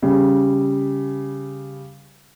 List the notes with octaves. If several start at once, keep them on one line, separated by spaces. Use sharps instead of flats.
C#3 G3